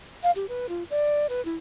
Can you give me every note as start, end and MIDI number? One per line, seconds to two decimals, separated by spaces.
0.23 0.31 77
0.35 0.48 67
0.49 0.67 71
0.69 0.83 65
0.90 1.27 74
1.29 1.44 71
1.45 1.57 64